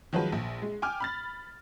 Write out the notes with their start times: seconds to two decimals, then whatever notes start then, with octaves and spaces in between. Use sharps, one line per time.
0.13 D#3 F3 F#3 G#3 B4
0.32 A#1
0.62 G#3
0.82 G5 G#5 D6 F6
1.00 B5 F6 A6